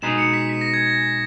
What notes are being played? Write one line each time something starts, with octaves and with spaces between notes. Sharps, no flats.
B2 G#3 D#4 G#4 B4 E7
C#7
B6
B6
A#6
G#6
A#6